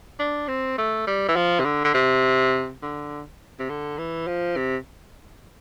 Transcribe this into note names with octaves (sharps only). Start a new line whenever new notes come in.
D4
C4
A3
G3
E3
F3
C3
D3
D3
C3
D3
C3
D3
E3
F3
C3